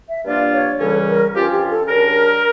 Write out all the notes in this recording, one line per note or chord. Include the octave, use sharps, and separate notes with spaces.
E5
G2 F3 A#3 D4 F4 D5
C#5
C#2 C#3 E3 G3 C#4 A4
A#4
G2 F3 C#4 F4 G4
G4
A4
C#3 G3 D4 A#4